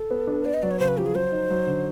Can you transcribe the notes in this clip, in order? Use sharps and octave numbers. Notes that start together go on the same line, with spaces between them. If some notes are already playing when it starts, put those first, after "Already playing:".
Already playing: A4
B3
D4
B3 D5
D#5
F#3 D5
C#5
C#3 C5
B4
F3 G4
G#4
F#3 C5
D#4
F#3
D3